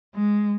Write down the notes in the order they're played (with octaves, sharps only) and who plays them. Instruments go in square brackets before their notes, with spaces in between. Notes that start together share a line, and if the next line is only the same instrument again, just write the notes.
[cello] G#3